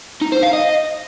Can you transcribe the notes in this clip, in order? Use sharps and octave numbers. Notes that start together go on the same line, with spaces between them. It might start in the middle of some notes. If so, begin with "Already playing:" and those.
D#4
C5
F5
D#5